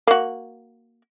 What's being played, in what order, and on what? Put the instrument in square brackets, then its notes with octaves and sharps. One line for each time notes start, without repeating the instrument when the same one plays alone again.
[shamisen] A#3 F#4